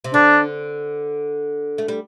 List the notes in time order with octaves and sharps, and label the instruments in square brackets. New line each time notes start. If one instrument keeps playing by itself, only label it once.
[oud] C3
[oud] D3 [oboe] D4
[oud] A3
G3